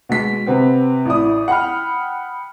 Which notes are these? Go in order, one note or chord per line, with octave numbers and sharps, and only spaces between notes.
B2 G#3 B6
C3 B3 C4
A1 E4 D5 D#6
F#5 G5 B5 F6